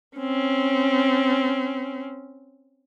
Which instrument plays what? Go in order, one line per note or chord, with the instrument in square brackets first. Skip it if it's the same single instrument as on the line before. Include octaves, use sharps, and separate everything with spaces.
[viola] C4 C#4